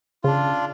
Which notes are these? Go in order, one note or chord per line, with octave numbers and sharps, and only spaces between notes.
C#3 D4 F4